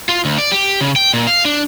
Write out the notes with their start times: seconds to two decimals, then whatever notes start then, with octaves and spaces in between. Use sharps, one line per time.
0.09 F4
0.25 D2
0.39 D5
0.52 G4
0.81 C#3
0.96 G5
1.14 A#2
1.27 F5
1.45 D4